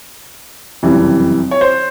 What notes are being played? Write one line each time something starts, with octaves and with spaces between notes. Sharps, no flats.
F#1 F2 C3 E3 G3
C#5
C5